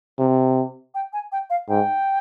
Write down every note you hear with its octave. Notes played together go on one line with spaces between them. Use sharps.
C3
G5
G#5
G5
F5
G#2 G5